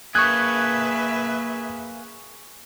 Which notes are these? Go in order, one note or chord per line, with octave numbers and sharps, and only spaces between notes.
A#3 G#4 B4 E5 C#6 D#6 F#6 G#6